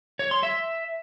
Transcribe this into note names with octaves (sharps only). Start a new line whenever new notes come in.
C#5
C6
E5